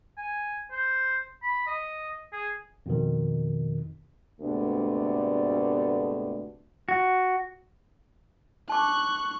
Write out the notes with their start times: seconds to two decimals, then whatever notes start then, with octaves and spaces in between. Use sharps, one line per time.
0.18 G#5
0.72 C5
1.43 B5
1.67 D#5
2.33 G#4
2.86 F2 B2 D#3
4.41 D2 G#2 C3 A3 B3 D4
6.89 F#4
8.69 A5 C#6 D6 F#6